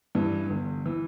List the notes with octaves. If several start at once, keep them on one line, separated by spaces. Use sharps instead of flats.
G2 E3
G1
E3